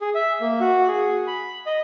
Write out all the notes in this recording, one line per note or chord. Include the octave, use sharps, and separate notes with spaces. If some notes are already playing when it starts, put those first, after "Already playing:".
G#4
E5
A#3
F#4
G#4
B5
D#5